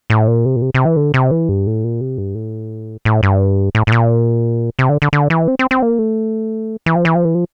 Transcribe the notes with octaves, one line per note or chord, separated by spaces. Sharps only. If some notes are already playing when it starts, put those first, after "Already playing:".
A2
A#2
C3
A#2
C3
C3
E3
D3
C3
E3
G2
A2
A#2
C3
G2
A2
A2
G2
A2
A2
A#2
C3
D3
D3
D3
E3
C4
C4
C4
A#3
A3
E3
F3
E3
F3
E3
F3